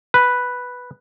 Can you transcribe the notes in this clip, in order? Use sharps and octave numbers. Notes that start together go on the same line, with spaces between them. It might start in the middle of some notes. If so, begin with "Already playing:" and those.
B4